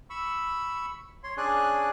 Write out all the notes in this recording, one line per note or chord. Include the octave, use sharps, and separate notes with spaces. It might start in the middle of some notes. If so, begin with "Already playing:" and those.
B5 C#6 E6
C#5 C6
C#4 D4 G#4 D5 G#5 F#6